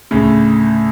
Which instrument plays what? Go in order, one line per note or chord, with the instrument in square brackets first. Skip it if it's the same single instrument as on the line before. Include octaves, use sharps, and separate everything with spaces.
[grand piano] D2 A2 C#3